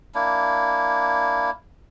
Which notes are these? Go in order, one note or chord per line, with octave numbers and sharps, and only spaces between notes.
A#3 D4 E4